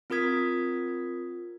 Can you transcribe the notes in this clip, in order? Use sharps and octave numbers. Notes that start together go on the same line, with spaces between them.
C4 F4 A#4 D#6 G#6 B6